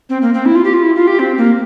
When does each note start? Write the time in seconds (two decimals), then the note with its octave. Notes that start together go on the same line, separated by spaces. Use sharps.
0.10 C4
0.22 A#3
0.34 C4
0.46 E4
0.55 F4
0.64 G4
0.74 F4
0.83 E4
0.96 F4
1.07 G4
1.19 C4
1.38 A#3